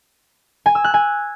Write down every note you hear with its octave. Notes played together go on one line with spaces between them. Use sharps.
G#5
E6
F#6
G#5